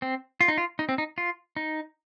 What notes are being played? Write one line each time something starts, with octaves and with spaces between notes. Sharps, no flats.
C4
F4
D#4
F4
D#4
C4
D#4
F4
D#4